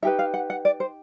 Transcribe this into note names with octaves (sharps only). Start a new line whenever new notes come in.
D#4 G4 B4 E5
F5
F#5
F#5
D5
C5